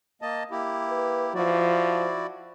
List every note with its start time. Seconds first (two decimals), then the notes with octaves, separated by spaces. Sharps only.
0.22 A#3 D#5 A5
0.51 A#3 E4 G4
0.89 B4
1.35 F3 E4 F#4 D5